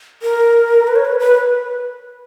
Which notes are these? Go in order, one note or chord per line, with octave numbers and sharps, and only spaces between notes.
A#4
B4
C#5
B4
B4